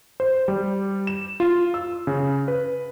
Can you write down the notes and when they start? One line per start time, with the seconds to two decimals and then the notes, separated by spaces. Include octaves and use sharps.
0.20 C5
0.48 G3
1.07 E7
1.40 F4
1.74 E6
2.07 C#3
2.48 B4